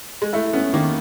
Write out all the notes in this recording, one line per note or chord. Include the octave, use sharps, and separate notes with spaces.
G#3
A3 E4
B3 C#4
D#3 A#3